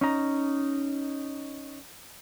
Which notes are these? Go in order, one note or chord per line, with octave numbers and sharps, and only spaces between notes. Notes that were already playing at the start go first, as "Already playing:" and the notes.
C#4 D#4 A#5